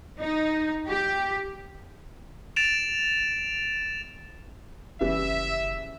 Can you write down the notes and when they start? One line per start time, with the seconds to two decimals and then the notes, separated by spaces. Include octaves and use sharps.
0.21 D#4
0.87 G4
2.56 A6 D7 E7 F7
5.00 F#1 C#3 E3 G3 E5